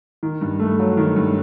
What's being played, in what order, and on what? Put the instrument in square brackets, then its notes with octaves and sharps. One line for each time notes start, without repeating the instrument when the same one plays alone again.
[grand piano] D#3
G2
A3
F#3
D#3
G2